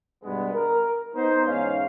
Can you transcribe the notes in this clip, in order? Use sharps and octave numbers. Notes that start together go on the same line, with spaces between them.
G2 B2 G#3 B3
A#4
B3 D#4 C5
E2 G#2 C#4 F5